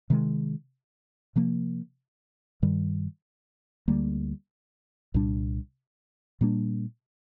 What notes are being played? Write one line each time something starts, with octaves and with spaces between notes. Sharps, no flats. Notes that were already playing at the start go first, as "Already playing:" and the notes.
C3 D#3 G#3
C3 F3 A#3
G2 D#3 G3
D2 D3 G3 A#3
C2 A#2 G3 D4
A#2 G3 A#3 D4